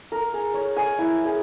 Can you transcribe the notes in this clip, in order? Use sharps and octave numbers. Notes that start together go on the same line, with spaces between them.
A#4
G#4
C#5
G#5
E4
G#4